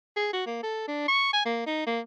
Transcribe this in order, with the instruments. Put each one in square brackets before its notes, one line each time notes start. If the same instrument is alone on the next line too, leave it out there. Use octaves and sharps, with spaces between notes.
[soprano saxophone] G#4
F#4
A#3
A4
D4
C#6
G#5
A#3
D#4
A#3